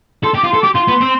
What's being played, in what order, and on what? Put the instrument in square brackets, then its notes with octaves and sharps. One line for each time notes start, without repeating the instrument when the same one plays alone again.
[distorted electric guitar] A4 [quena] C6
[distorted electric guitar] G4
[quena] D6
[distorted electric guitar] F4
[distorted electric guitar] A4 [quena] C6
[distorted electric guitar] G4 [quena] D6
[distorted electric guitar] F4 [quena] C6
[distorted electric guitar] B3
C4